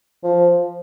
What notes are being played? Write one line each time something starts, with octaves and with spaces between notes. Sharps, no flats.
F3